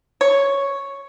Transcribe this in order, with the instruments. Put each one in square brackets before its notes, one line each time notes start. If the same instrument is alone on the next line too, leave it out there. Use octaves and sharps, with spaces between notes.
[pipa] C#5